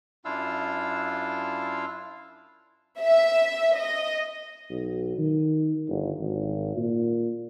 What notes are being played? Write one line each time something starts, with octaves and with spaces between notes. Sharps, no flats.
F#2 D4 E4 F4 F5 E6
E5
D#5
B1
D#3
G1
G#1
A#2